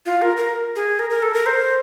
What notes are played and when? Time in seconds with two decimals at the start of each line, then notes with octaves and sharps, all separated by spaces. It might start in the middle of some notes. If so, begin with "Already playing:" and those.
0.06 F4
0.22 A#4
0.37 A#4
0.76 G#4
0.99 A#4
1.10 A#4
1.22 A4
1.34 A#4
1.46 C5